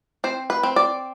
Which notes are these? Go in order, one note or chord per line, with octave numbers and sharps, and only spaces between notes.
C4 C5
B4
C4
D5